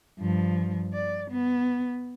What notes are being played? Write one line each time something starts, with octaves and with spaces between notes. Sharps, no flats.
G2 F3
D5
B3